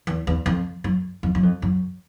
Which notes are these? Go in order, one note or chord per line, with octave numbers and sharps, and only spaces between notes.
E2
E2
F2
F#2
F2
F#2
F2
F#2